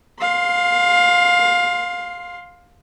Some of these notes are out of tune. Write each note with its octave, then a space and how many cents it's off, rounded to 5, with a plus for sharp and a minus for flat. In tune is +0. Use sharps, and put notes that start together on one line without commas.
F5 +20 C6 +0